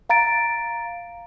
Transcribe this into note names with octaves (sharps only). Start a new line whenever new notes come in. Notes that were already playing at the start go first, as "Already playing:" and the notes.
F5 A#5 A6 D7